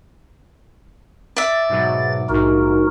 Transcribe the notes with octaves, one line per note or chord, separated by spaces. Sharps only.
D5 E5 A6
G#2 B2 F#3
A#1 G#2 D#4 F#4 A#4